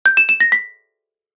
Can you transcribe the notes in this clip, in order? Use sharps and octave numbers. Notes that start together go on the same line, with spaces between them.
G6
E7
E7
A#6
B6